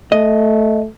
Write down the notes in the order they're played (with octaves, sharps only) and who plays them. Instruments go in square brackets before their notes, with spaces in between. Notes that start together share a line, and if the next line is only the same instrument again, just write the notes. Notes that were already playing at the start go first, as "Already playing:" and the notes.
[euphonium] A3 [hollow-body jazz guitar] D#5